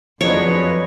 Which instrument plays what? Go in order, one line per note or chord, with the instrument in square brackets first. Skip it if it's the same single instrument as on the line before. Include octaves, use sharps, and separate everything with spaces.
[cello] F2 [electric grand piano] F3 F#3 D4 [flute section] G#4 B4 D#5 [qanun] C#5